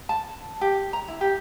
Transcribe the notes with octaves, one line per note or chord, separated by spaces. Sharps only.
A5
G4
A#5
E4
G4